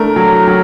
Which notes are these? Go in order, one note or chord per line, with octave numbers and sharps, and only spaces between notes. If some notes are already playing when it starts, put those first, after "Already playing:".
Already playing: A3 D4 A#4
F#3
F#3